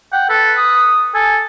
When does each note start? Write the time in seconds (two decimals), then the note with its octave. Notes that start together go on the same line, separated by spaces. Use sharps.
0.13 F#5 G5
0.30 A4 B4
0.57 D#6
1.15 A4 G#5